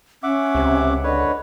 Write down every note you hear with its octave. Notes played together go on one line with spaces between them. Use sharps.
C#4 E5 F#5 D6
C#2 C3
D3 B4 C#5 D#5